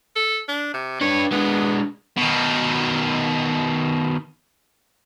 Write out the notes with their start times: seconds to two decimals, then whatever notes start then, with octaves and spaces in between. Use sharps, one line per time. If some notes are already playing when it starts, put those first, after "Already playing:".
0.16 A4
0.48 D4
0.74 C3
1.01 D4 B4 C#5
1.32 G#3 B3 D4
2.18 B2 D#3